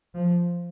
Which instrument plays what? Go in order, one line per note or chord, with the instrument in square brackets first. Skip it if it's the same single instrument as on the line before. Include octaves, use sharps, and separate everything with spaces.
[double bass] F3